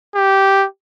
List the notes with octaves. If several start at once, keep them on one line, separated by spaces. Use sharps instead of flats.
G4